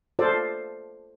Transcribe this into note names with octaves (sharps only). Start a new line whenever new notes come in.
F4 A4 C5 D5